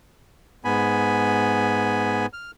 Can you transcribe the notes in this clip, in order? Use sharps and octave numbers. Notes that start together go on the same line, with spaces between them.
G#2 B3 G#5 B5
F6